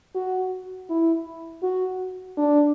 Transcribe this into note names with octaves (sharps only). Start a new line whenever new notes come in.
F#4
E4
F#4
D4